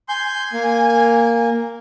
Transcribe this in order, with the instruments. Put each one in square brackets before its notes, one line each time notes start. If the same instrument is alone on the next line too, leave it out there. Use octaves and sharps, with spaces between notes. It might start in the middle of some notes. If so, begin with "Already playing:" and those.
[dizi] G#5 [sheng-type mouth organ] C6 G6
[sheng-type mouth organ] A#3